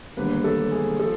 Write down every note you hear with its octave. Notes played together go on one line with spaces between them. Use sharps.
E1 D#2 D3 G3 A#3 B4
A4
G#4
F3 A4